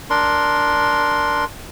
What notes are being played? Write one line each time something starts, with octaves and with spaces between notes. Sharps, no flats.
D4 A#4 C6